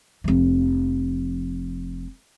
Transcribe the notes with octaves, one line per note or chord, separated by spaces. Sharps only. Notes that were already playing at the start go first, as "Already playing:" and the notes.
F1 F3